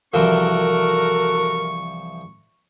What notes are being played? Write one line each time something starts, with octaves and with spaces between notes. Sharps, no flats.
C2 E3 F3 F#4 A4 A#4 C#6